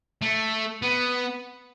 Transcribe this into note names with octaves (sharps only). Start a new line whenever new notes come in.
A3
B3